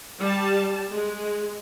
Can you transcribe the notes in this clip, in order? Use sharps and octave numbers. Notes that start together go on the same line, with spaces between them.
G3 A5
G#3